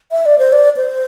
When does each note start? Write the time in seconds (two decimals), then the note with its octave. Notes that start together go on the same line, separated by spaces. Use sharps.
0.11 E5
0.26 D5
0.39 C5
0.53 D5
0.77 C5